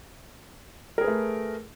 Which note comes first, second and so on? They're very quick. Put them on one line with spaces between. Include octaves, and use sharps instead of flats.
A#4 G#4 B4 A3